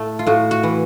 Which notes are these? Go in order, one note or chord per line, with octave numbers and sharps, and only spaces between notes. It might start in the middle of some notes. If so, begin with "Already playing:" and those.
Already playing: A2 A3
F4
A2 F#4
F#4
E3